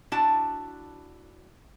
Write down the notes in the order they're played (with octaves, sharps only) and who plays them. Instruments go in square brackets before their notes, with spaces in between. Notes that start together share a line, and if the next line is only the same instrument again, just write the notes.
[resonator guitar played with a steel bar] D4 E4 F#4 A5